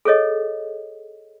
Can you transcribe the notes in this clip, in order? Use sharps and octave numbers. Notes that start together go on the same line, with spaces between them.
G#4 A4 C#5 D#5